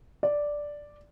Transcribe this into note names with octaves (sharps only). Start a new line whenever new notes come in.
D5